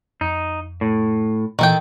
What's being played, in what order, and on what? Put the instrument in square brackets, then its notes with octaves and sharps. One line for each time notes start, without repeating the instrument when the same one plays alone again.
[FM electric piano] F2 [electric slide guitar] D#4
[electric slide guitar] A2
[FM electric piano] A#2 E3 [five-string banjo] D#3 A4 G5